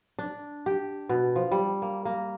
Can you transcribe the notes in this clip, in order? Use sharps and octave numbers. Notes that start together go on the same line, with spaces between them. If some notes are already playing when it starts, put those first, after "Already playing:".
D4
G4
B2
F3
G3
A#3
A#3